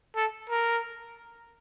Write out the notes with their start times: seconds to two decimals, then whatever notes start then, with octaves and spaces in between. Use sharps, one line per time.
0.16 A4
0.50 A#4